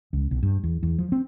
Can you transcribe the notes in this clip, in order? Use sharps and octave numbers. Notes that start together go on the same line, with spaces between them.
C#2
B1
G2
E2
E2
F3
C4